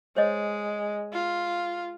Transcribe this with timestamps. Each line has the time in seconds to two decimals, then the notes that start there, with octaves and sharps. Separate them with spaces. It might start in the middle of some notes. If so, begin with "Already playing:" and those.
0.17 G#3 C5 C#5 D#5
1.13 F4